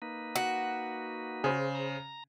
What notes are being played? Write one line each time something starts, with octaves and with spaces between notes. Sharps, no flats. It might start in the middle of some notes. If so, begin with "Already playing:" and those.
A#3 D#4 B4
F#4
C#3 G#4 C5
A#5